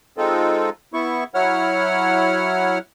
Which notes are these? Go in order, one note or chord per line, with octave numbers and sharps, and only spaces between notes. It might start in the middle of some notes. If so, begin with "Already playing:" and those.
G#3 C4 D#4 F4 A4
B3 E4 C#6
F#3 E4 C#5 F#5 F6